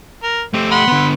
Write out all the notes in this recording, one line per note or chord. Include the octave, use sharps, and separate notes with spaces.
A#4
A3 C4 G4
F#5 B5 C6
D3 B3